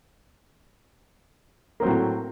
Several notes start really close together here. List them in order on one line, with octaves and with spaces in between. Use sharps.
A#3 C4 F#3 A2